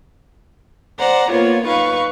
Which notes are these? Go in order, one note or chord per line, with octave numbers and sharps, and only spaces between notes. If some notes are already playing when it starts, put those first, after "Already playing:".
C5 D5 F#5 A#5
A#3 B3 F4 C#5
D#4 B4 F5 C#6